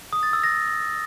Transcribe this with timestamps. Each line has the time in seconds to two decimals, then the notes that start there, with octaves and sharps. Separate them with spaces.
0.13 D#6
0.23 A6
0.33 E6
0.44 A#6